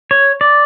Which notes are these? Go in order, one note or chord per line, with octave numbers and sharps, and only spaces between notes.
C#5
D5